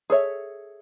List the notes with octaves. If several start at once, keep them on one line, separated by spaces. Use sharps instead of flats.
G#4 A4 C#5 E5